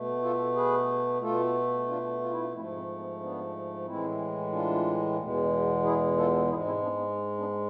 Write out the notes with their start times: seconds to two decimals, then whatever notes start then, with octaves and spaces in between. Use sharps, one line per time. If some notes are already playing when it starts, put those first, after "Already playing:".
Already playing: B2 A3
0.22 F4 A4
0.55 G#4 B4
1.21 B2 A3 F4 A4
1.88 D4 F4
2.21 F4
2.30 E4
2.41 D4 F4
2.53 G#2 F3 A3 C4 E4
2.76 C4
2.98 B3
3.20 B3 D4
3.85 A2 E3 G#3 C4 E4
4.51 D4 F4
5.18 E2 B2 G#3
5.83 E4 G#4
6.17 F4 A4
6.49 G#2 E4 G#4
6.53 G#3
6.66 C4 E4
6.83 B3 D4
6.99 B3
7.38 B3 D4